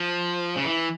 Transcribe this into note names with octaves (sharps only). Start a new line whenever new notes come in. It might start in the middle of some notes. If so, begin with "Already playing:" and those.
Already playing: F3
C#3
E3